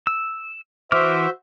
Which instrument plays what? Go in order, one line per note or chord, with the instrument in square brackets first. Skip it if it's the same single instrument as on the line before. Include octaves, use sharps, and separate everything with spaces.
[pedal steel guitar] E6
[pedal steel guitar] E3 D6 F6 [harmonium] F#4 C5 E5